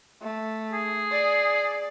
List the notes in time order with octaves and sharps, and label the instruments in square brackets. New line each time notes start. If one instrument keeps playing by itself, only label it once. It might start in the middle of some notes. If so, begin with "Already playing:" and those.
[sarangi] A3
[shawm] G#4
[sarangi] D5